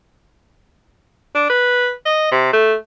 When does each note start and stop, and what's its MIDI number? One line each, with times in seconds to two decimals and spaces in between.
1.35 1.49 62
1.50 1.92 71
2.06 2.29 75
2.32 2.53 48
2.53 2.74 57